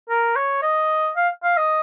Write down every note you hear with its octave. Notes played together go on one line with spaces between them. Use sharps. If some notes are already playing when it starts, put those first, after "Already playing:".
A#4
C#5
D#5
F5
F5
D#5